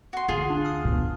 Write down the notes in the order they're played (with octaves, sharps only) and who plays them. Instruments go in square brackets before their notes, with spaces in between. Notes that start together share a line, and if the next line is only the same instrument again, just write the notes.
[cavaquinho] F#4 C6
[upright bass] D2 [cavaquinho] F4 G#4
[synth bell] D4
D#6 F6
[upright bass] B2